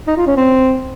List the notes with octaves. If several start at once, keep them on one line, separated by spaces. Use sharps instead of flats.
D#4
F4
C#4
C4